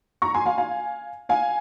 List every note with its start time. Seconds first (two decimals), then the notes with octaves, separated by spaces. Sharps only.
0.22 A#5 C#6
0.34 G#5 C6
0.46 F5 G#5
0.58 F5 G#5
1.29 F5 G#5